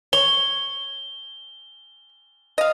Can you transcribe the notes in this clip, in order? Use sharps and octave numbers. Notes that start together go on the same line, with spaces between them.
C#5 G7
D#5 F5